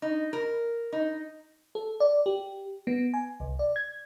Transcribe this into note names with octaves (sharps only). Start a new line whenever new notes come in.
D#4
A#4
D#4
A4
D5
G4
B3
G#5
C2
D5
G#6